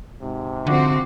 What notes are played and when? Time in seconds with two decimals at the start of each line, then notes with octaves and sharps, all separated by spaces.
0.21 G#2 C3
0.67 D3 F3 C4 F#4 D6